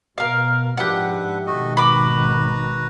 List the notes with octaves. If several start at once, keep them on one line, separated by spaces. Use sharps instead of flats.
B2 A#4 F5
G#2 F3 D4 G4 B4 E5 F#5
G#1 B2 D#3 A3 F#4 D#5
F#4 B4 A#5 B5 D6